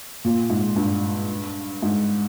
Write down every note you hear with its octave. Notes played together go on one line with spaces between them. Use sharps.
A#2
G#2
G2
G#2